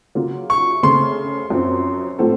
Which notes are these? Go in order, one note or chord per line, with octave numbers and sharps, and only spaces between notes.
C#3 F#3 A#3 F4
C#6
C#3 A3 C4 C6
F#2 F3 C4
A2 F3 C4 F#4 A4